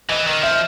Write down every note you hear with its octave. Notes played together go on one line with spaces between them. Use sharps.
E3 D#5
D#3 D#5
F3 E5